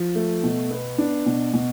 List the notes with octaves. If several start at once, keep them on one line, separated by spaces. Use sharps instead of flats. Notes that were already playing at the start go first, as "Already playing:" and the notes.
Already playing: F3
A3
B2
B3
D4
B2
B2